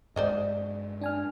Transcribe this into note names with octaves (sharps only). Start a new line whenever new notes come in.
G2 G#3 C5 D5 D#5
D4 G#5 F6